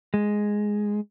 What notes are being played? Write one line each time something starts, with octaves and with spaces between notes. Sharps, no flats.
G#3